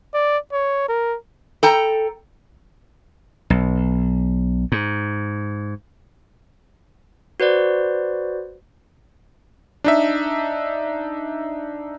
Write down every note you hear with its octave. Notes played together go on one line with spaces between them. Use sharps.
D5
C#5
A#4
A4 G5 A#5
B1
G#2
F#4 B4 C5 D5
D4 D#4 E5